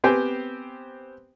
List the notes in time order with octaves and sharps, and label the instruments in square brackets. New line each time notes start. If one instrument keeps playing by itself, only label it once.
[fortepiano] B3 C4 G4 C5 G5 G#5